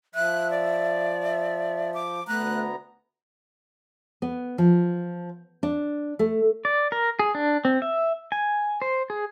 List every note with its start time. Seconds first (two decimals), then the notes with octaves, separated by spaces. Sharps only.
0.15 F3 E5 F#6
0.51 D5
1.23 E5
1.94 D6
2.28 D2 A3 B3 A#5 F#6
4.22 B3
4.58 F3
5.63 D4
6.19 A3
6.65 D5
6.92 A#4
7.19 G#4
7.35 D4
7.65 C4
7.82 E5
8.32 G#5
8.82 C5
9.10 G#4